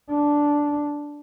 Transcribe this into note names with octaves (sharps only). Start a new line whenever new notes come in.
D4